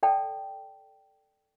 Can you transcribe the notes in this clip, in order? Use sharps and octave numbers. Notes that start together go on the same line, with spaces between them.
A4 D5 G5 A5